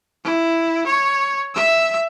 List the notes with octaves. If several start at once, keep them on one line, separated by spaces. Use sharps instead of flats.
E4
C#5
E5 E6